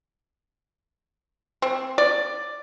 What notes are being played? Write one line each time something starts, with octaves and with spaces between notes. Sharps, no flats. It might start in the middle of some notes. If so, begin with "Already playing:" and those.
C4
D5